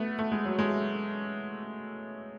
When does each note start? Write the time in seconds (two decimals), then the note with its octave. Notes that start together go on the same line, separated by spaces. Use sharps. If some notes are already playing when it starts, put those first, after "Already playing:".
Already playing: A3 B3
0.19 A3
0.32 G#3
0.45 F#3
0.59 G#3